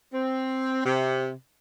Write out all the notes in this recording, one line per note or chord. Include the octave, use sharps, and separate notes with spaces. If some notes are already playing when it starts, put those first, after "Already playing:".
C4
C3